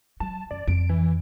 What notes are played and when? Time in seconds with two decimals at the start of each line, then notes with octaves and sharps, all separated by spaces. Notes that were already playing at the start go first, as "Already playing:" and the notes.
0.20 F#3 A5
0.51 F#2 D5
0.68 F2 D7
0.89 E3